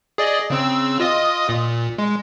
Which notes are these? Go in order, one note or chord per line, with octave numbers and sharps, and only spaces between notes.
G#4 D5 D#5
C#3 C4 E6
F4 D#5 D#6
A#2
G#3